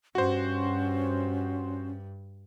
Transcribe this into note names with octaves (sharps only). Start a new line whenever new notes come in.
G2 C#4 F#4 C5